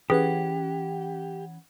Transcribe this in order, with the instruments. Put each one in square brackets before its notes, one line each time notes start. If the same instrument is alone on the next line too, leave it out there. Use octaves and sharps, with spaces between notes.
[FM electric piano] E3 C#4 F#5 [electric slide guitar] G4 [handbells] G#4 B4